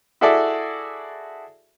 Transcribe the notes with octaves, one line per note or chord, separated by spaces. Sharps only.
E4 F#4 G#4 A4 D5 E5